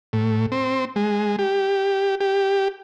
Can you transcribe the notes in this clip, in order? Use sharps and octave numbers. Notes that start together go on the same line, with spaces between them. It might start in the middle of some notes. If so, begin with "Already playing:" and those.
A2
C4
G#3
G4
G4